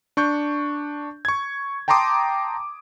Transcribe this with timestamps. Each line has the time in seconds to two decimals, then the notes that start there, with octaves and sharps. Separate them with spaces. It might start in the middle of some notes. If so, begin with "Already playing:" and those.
0.17 D4 C#6 G6
1.25 C#6 G#6
1.88 G5 A5 A#5 C6 D6 D#6